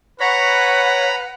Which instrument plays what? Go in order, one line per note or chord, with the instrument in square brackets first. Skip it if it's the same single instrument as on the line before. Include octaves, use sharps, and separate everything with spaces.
[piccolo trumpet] B4 [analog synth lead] C#5 [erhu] F#5 [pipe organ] A#5 B5